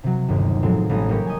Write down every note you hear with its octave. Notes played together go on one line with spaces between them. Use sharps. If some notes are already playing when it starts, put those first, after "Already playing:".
C3 F#3
G1 D#2
A2 F3 F#3 G#3 C4
A1 F3 G3 G#4 A#5 D#6
G3 A#3 G4 A#4 C#5
D#5 G#5